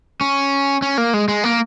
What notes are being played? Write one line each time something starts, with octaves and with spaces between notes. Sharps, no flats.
C#4
C#4
A#3
G#3
G#3
A#3